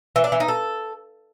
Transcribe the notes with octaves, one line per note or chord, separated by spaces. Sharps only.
E3
D4
E3
D#4
A4